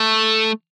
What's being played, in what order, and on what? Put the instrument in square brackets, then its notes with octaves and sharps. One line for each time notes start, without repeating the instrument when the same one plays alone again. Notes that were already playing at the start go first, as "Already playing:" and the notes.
Already playing: [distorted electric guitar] A3